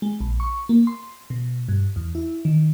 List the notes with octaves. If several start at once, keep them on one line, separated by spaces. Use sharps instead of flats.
G#3
A#1
C#6
A#3
C6
B2
G2
E2
E4
D#3